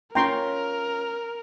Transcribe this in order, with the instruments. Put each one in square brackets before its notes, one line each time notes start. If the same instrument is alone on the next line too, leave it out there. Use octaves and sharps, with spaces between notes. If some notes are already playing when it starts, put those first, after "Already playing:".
[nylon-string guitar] C#4 F4 C#5 [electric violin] A#4 [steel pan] G5 A#5 C6